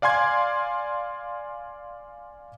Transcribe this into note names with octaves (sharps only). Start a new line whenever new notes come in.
D5 F5 G#5 C6 G#6